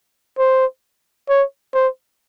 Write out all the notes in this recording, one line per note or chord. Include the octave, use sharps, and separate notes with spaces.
C5
C#5
C5